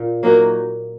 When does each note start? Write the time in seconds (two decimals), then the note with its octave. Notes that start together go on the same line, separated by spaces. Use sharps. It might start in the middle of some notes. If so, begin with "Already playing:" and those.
Already playing: A#2
0.23 F#3 A#3 D#4 F#4